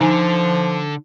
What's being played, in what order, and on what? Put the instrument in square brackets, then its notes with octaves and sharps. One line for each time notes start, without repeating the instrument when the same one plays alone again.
[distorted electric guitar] D3 [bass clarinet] F3 [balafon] D#4 G#5